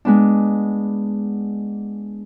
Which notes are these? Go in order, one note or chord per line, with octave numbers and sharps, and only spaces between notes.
G#3 B3 D4